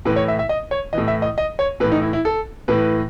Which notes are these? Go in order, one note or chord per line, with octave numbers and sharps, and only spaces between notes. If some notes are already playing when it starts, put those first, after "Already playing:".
A2 E3 B4
C#5
E5
E5
D#5
C#5
A2 E3 D#5
E5
D#5
D#5
C#5
A2 E3 B4
D#4
E4
E4
A4
A2 E3 B4